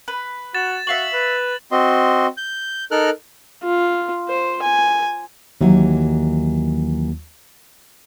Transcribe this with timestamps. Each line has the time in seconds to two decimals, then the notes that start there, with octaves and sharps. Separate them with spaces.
0.08 B4
0.55 F#4 A6 E7
0.87 F#4 E5 F5 C#6 F#7
1.13 B4
1.72 C4 F#4 D#5 C6
2.37 G6
2.91 D#4 A4 A#4 F6 F#6
3.63 F4
4.28 C5
4.62 G#5
5.61 D#2 E3 F#3